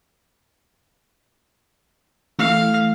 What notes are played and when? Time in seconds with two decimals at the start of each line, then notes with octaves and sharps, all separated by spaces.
2.39 E3 A3 F5